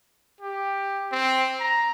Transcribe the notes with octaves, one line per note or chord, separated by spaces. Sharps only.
G4
C4
A#5